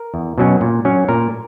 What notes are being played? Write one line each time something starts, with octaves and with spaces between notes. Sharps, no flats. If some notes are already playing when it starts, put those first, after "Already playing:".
Already playing: A#4
E2
B2 F#3 C#4
A#2
F#3 C#4
A#2 A#4